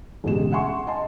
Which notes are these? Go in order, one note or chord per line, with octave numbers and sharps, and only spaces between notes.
A1 D2 B2 G#3 G4 E7
E5 F#5 G#5 C6 C#6
D#5 G#5 A5 C6